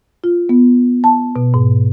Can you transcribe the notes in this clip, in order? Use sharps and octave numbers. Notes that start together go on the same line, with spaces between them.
F4
B3
A5
B2
G#2